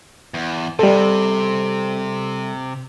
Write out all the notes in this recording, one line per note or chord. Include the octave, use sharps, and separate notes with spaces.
E2
C3 G3 A4